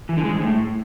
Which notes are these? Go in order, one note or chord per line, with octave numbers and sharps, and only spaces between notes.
E3
D3
G#3
G#2
A2